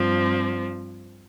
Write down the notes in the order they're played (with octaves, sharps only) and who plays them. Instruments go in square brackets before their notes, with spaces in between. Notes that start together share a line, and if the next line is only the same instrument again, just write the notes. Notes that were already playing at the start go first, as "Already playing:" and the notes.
Already playing: [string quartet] G2 F3 C4